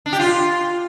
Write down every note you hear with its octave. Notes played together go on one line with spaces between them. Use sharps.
D4
G4
F4